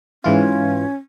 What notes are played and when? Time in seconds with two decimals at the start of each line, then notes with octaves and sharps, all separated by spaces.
0.24 G#2 E3 C#4 F4